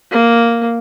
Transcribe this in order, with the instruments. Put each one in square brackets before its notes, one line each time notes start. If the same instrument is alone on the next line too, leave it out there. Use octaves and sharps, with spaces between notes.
[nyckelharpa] A#3